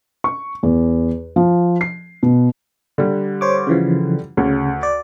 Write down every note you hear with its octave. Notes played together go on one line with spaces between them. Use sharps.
C#6
E2
F3
C7
B2
D3 G3
C5 C#5 D6
C#3 E3 F3
D2 C#3
D5